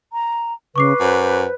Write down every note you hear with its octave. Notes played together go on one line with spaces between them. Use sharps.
A#5
C#3 B4 C#6 D6 C7
F#2 C5